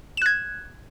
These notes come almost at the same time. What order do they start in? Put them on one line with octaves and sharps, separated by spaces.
E7 F#6 G#6